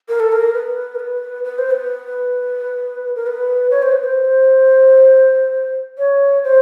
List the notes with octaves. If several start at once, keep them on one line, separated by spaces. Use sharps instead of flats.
A#4
A4
A#4
B4
A#4
B4
B4
C5
B4
A#4
B4
C#5
C5
B4
C5
C#5
C5